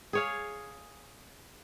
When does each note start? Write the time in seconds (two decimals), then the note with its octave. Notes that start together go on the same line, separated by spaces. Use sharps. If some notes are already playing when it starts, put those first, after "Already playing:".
0.13 G#4 C#5 F5